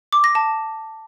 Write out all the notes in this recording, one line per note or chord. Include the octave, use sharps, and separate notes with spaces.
D6
A#6
A5